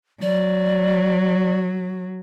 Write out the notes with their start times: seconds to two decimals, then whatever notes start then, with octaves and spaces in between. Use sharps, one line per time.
0.22 F#3 D5